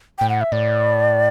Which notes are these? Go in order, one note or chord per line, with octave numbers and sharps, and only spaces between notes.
A2 G5
F#5
E5
A2 D5